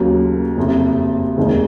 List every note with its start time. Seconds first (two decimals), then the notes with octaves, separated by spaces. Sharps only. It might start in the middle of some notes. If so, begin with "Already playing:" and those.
Already playing: D#2 C#3 F#3 A#3
0.57 F#1 F2 C3
1.37 F1 D#2 D#3 G#3 C4